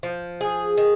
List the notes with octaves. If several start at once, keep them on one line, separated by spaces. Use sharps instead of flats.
F3
G#4
D#3